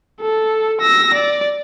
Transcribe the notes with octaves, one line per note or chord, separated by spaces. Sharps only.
A4
E6 A#6
D5